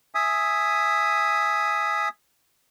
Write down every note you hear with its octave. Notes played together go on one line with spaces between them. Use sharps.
E5 G#5 D#6